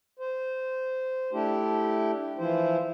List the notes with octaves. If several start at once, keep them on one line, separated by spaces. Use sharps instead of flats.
C5
A3 D4 E4 G4
E3 F3 E4 C5